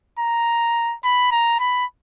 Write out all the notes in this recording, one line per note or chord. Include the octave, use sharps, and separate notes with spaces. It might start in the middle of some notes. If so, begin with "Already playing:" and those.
A#5
B5
A#5
B5